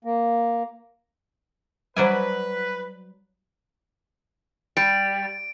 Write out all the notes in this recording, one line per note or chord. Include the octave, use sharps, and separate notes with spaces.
A#3
F#3 G3 B4 C5 D5 G#5
G3 D7